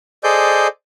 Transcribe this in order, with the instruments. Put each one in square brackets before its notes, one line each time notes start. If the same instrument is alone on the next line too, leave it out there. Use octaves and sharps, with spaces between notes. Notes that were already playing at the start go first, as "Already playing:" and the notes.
[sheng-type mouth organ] G#4 A4 C5 D5 D#5 G6